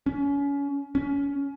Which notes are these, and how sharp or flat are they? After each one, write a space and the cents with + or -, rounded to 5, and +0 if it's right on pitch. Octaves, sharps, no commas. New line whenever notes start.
C#4 +30
C#4 +25